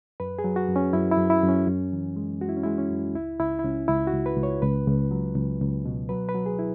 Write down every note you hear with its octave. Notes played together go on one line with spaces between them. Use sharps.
F#2 B4
G#4
F#3
F#4
F#2
C#4
F#2 E4
E4
F#2
E4
F#2
C#4
F#2
E3
G#3
G#3 F#4
E4
C#4
G#3 E4
C#4
F#2
C#2 E4
C#2 E4
E4
C#2 C#4
C#2 E4
F#4
C#2
B4
C#2
C#5
C#2 B4
C#2
F#3
C#2
C#2
B2
F#3 B4
B4
F#3
G#4
E4